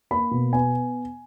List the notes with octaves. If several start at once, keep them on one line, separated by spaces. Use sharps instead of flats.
A#3 B5
B2
B3 G#5